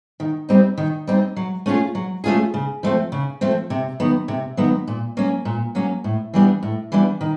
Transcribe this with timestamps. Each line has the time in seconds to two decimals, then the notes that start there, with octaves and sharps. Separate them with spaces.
0.20 D#3
0.49 G3 C4 D#4
0.78 D#3
1.07 G3 C4 D#4
1.36 F#3
1.66 A3 C#4 F4 G#4
1.95 F#3
2.24 A3 C#4 F4 G#4
2.54 C#3
2.83 F3 A3 C4
3.12 C#3
3.41 F3 A3 C4
3.70 C3
4.00 D#3 F#3 B3
4.28 C3
4.57 D#3 F#3 B3
4.87 A#2
5.17 F#3 A#3 C#4
5.45 A#2
5.75 F#3 A#3 C#4
6.04 A2
6.34 E3 G3 B3 D4
6.63 A2
6.92 E3 G3 B3 D4
7.21 D#3